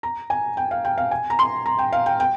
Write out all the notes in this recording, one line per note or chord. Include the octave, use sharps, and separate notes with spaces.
A#5
G#5
G5
F5
G5
F5
G#5
A#5
C6
A#5
G5
F5
G5
G5